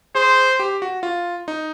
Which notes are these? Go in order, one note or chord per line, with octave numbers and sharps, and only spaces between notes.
G#4 C5
G4
F#4
F4
D#4